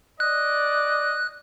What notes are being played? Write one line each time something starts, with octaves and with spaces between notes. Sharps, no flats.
D5 D#5 F#6